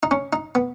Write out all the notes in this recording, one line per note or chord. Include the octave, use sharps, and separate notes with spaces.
D#4
C#4
D#4
B3